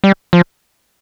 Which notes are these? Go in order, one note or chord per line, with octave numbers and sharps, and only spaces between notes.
G3
F3